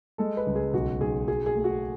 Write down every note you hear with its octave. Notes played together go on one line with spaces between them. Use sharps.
G#3 A4
B4
C#2
G#4
B1 F#4
B1 G#4
F#3 G#4
G#4
A3
F#4